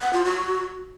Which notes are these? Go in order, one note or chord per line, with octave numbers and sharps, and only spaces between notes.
F#5
F4
F#4